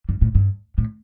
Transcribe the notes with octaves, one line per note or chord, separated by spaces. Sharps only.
G2
A2
G2
A2